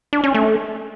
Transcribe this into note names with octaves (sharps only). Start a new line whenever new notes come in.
D4
C#4
A3